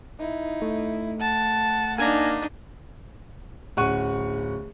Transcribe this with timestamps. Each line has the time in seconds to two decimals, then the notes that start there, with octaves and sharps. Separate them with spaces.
0.20 D#4 E4
0.62 A3
1.21 F#5 A5
1.98 A#3 D4 D#4 G#5 G#6 A#6
3.77 D1 C#4 F#5 C#6 F#6 D#7